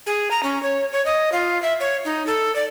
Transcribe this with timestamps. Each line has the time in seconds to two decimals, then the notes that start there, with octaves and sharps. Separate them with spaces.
0.06 G#4
0.31 A#5
0.43 C#4
0.63 C#5
0.92 C#5
1.06 D#5
1.32 F4
1.62 E5
1.80 C#5
2.05 D#4
2.27 A4
2.55 D5